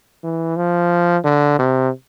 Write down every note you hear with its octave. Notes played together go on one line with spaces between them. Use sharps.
E3
F3
D3
C3